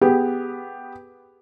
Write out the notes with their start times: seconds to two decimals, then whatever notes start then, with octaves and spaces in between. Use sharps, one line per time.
0.01 B3 G4 G#4